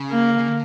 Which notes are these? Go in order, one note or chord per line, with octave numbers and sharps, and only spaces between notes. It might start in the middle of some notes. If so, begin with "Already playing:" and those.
Already playing: C#3
A#3
C#3
D3